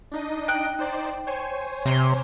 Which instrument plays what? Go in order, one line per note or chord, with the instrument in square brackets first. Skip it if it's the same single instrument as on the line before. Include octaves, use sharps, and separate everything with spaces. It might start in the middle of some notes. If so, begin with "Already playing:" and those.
[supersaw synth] D4 D#4 D#5
[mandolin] G5 F#6
[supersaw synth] D#4 C5 D5
C5 C#5 G#5
[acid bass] C3 [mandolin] A#5 C6